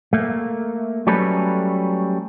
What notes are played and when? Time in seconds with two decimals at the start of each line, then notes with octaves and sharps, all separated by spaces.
0.13 A3 A#3
1.07 F#3 G3 A3 C#4 A4 B4